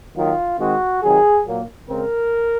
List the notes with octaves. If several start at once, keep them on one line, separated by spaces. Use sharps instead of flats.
D#3 F#3 A#3 F4
D#3 G#3 C4 F#4
C3 D#3 F#3 G#4
A#2 F#3 A#3
C#3 G#3 C4 A#4